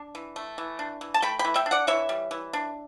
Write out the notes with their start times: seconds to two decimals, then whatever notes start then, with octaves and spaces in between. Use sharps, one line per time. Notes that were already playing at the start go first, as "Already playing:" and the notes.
Already playing: D4
0.15 E3
0.36 A3
0.58 E3
0.79 D4
1.01 E3
1.14 A5
1.22 A3 G5 B5
1.39 G5 B5
1.45 E3
1.56 E5 G5
1.66 D4
1.71 D5 F#5
1.87 E3 C#5 E5
2.09 G3
2.31 E3
2.53 D4